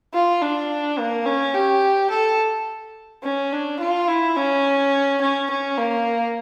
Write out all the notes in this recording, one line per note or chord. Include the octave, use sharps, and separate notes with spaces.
F4
D4
A#3
C#4
G4
A4
C#4
D4
F4
E4
C#4
C#4
C#4
A#3